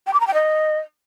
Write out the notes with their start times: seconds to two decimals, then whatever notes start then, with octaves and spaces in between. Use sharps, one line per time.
0.07 G5
0.13 D6
0.20 A#5
0.27 G5
0.34 D#5